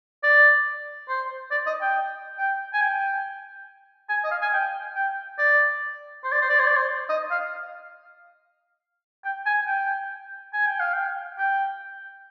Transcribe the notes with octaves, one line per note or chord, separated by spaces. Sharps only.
D5
C5
D5
D#5
G5
G5
G#5
G5
G#5
D#5
F5
G#5
G5
G5
D5
C5
D5
C5
D5
C5
D5
C5
D#5
F5
G5
G#5
G5
G#5
G5
F5
G5
G5